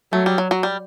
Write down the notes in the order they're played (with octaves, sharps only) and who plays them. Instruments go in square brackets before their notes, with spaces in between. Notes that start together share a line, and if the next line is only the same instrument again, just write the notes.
[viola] F#3 [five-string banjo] A3
[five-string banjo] G3
F#3
F#3
G3